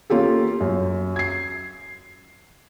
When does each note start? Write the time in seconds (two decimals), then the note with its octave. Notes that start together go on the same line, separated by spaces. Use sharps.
0.10 A#3 C#4 F4 G4 A4
0.61 F#2
1.16 G#6 C7